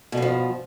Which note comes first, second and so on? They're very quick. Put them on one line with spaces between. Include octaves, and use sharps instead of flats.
B2 G2 F3